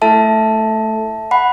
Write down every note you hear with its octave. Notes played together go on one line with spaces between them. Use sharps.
A3 E4 A4 E5 A5
F#5 B5